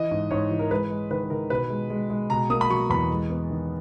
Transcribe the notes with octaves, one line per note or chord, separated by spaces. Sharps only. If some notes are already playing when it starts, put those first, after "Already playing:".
Already playing: E3 D#5
G#2
G#2 C#5
E3
A#4
G#3 B4
G#3
D#3 B4
D#3 A#4
B2 B4
G#3
G#3
G#3
B2 A#5
A#3 D#6
B5
F#3 C#6
E2 B5
G#3
B3
D#3